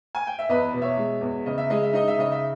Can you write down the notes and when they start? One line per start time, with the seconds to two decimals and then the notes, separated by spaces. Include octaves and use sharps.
0.15 G#5
0.27 G5
0.39 E5
0.49 E2 B4 D#5
0.74 B2
0.82 C#5 E5
0.97 G#3
1.21 E2
1.46 C#3 D#5
1.58 E5
1.70 G#3 D#5
1.83 E5
1.93 D#4 D#5
2.08 E5
2.18 C#3 D#5
2.32 E5